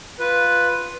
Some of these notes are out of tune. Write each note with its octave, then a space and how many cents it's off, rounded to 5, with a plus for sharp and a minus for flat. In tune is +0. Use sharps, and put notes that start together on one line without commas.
F4 +0 B4 +0